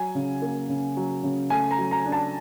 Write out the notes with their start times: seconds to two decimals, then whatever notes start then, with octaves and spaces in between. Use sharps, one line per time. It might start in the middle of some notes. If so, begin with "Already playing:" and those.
Already playing: F#3 G#5
0.15 C#3
0.42 A#3
0.69 C#3
0.97 F#3
1.23 C#3
1.50 A3 G#5
1.71 A#5
1.78 F#3
1.91 A#5
2.05 D4
2.12 A5